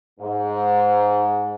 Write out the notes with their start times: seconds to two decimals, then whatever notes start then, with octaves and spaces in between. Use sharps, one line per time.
0.20 G#2